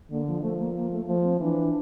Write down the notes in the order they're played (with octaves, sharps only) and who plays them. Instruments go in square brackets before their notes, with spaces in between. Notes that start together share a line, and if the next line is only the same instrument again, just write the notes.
[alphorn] D3 [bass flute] A#3
[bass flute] F3
[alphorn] F3 [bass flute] A3
[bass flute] A#3
A#3
A3
[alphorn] F3 [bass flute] A3
[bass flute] C4
[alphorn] E3 [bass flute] D4